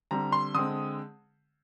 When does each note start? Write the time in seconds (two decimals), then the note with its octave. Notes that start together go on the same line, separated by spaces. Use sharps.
0.11 D3 G3 C4 A#5
0.32 C6
0.55 D3 G#3 C4 D#6